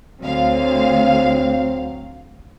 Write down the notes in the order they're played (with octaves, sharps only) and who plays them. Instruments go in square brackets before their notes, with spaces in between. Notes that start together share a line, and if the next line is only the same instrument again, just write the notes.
[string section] D2 F5 [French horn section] F#3 C4